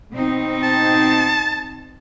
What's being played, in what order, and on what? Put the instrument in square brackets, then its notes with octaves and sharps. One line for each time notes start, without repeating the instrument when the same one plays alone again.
[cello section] B2 C4 D#4
[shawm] A5